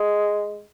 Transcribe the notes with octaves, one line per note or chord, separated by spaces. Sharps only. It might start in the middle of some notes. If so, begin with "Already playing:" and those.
Already playing: G#3